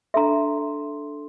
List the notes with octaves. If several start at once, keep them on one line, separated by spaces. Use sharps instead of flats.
D4 A4 E5 A#5 C6